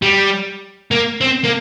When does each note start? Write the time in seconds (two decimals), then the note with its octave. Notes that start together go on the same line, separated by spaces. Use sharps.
0.02 G3
0.91 A#3
1.21 C4
1.44 A#3